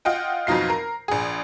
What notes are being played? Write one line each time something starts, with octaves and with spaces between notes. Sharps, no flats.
F4 D#5 F#5 G5
F2 B2 F#3 D#4 F4 C7
A#4
A#1 G#4